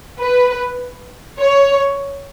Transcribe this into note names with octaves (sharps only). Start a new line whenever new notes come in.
B4
C#5